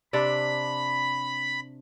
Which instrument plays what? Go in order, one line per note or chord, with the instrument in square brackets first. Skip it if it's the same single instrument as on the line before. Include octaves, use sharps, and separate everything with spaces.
[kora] C3 D4 D5 [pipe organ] B5